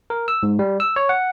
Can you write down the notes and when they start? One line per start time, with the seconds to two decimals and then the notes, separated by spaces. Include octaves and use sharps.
0.10 A#4
0.28 E6
0.43 G#2
0.59 G3
0.80 E6
0.96 C#5
1.09 F#5